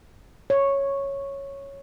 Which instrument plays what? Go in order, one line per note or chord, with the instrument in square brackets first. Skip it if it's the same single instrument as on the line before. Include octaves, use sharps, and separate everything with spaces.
[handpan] C#5